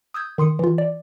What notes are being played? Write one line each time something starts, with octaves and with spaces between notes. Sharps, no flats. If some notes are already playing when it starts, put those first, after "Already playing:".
D#6 E6 G6 G#6
D#3 C6 D#6 C#7
E3 F4
D5